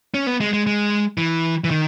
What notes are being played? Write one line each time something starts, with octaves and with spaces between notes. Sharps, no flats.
C#4
B3
G#3
G#3
G#3
E3
E3
D#3